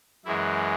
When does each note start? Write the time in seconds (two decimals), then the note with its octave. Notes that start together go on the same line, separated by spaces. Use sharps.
0.25 F#2 E3 G#3 E4